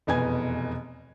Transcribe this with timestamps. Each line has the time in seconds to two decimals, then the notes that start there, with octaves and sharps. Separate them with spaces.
0.07 F1 E2 B2 B3 G#5 G#6